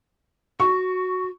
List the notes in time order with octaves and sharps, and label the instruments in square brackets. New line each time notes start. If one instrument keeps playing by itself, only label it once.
[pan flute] F#4 [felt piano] C#6